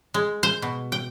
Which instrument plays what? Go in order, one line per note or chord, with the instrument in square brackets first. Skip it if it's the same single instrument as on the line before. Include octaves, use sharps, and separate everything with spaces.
[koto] G#3
C5
B2
G5